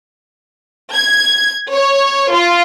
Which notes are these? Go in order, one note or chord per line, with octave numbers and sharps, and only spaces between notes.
G#6
C#5
F4